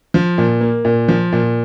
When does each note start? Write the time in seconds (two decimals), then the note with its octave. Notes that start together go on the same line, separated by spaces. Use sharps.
0.14 F3
0.38 A#2
0.61 A#3
0.85 A#2
1.08 F3
1.32 A#2